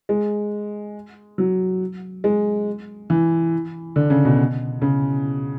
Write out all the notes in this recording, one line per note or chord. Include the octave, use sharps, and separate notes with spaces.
G#3
F#3
G#3
E3
D3
C#3
B2
C#3